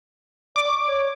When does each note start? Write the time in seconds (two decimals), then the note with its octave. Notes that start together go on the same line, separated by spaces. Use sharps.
0.56 D5 D6
0.67 C#6
0.87 C#5